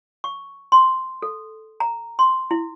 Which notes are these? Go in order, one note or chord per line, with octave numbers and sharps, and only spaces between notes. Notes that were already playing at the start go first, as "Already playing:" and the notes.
C#6
C6
A4
A#5
C6
E4